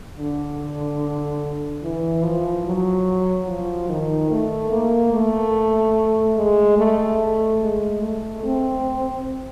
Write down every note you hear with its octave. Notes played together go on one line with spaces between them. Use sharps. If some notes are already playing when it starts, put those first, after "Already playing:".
D3
E3
F3
F#3
F3
D#3
A3
A#3
A3
G#3
A3
G#3
A3
C4